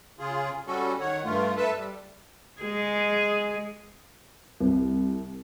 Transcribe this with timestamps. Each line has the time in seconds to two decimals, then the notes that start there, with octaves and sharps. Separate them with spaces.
0.19 C#3 F4 G#4
0.67 G3 C#4 F#4 A4
1.00 D#3 C#5 F#5
1.24 G2 A3 F4
1.57 A4 B4 E5 A5
1.74 G3
2.62 G#3 G#4
4.60 C2